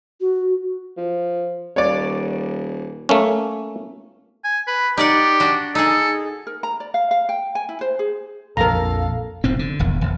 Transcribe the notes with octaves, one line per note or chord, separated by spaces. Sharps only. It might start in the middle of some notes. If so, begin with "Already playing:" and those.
F#4
F3
D#1 C#5 D5
A3 A#3 C#4
G#5
B4
D#4 G4 D5 F#5
D4 F#4
D#4 G#4 A4
A#4
A#5
D5
F5
F5
G5
G#5
E4
C5
G#4
A#1 F2 A#2 A4 A#4 F5 A#5
F1 G#2 C4
D3
D#1 G#1 E2
E1